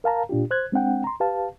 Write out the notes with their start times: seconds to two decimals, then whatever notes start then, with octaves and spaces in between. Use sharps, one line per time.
0.04 A#4 F5 A5 A#5
0.29 A#2 D4 F4 G4
0.51 C5 F#6 G#6
0.72 G#3 C4 D4 F#5 G5
1.04 A#5 C6
1.20 G4 B4 F5 A5